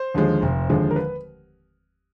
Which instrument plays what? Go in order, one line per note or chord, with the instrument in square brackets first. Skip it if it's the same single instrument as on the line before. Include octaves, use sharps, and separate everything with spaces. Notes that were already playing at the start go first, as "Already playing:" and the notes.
Already playing: [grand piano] C5
D#2 D3 F3 G#3
F1
D#2 D3 F3 G#3
A#4
B4